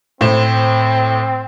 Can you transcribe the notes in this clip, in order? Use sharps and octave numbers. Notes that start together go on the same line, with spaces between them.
A2 C4 C5 E7